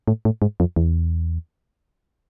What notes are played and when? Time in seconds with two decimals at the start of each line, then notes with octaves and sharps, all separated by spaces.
0.08 A2
0.25 A2
0.42 G#2
0.60 F2
0.76 E2